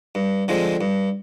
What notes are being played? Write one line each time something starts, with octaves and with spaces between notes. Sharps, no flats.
G2
D3 F3 G#3 C4
G2